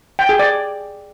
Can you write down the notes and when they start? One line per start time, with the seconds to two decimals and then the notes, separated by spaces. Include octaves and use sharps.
0.19 G5
0.29 G#4
0.39 D5